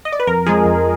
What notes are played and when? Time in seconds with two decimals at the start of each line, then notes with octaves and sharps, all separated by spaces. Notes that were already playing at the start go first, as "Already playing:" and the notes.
0.05 D#5
0.12 D5
0.20 B4
0.27 F2 A#4
0.46 F3 G#3 G#4
0.65 F2